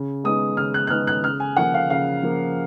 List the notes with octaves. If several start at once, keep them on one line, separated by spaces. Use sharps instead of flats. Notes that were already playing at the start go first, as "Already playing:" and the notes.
Already playing: C#3
G#3 B3 D#4 D#6
C#3 F6
F#6
F#6
G#3 B3 D#4 F6
F#6
C#3 F6
G#5
F3 A#3 F#5
F5
C#3 F5
F3 A#3